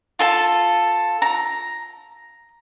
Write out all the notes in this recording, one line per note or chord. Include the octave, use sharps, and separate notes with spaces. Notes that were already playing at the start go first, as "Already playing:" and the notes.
F4 A4 A5
A#5